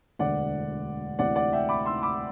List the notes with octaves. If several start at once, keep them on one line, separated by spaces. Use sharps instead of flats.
E1 D2 D3 D5 F#5
D2 C3 E3 D5 F#5
D5 F#5
E5 G5
B5 D6
C6 E6
B5 D6